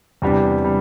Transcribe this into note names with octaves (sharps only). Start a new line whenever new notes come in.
E2 C3 G3 D4 G4
C3 G3 D4